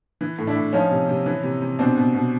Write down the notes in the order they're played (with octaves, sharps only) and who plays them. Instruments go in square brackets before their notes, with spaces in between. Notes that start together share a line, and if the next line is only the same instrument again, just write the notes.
[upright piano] E3
A2
D4 E4
A2
F3 C#4 D#4
C3
C3
E3
C3
C3
B2 C4 D4
B2
B2